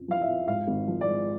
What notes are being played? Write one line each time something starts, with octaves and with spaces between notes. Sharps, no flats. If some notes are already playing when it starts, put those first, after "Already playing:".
Already playing: F2 C#3
F3 F5
E5
F2
G#2 F5
G#1
F3
D5
G#3